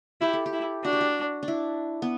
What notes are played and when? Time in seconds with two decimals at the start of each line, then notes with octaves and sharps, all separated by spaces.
0.21 E4 G4
0.33 A4
0.46 G4
0.53 E4
0.84 D4 F#4
0.93 G4
1.01 F#4
1.43 D4
1.48 E4
2.02 B3